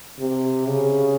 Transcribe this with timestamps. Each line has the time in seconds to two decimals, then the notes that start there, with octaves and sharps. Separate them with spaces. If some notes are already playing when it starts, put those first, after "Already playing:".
0.20 C3
0.66 C#3